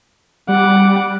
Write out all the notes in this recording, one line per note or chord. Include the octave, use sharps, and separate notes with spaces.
G3 F#5 D6